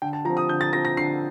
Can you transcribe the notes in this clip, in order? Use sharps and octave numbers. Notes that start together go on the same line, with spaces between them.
D3 G5
A5
F3 A#5
C4
D#6
D3 G6
A6
F3 C4 A#6
A#6
D3 C7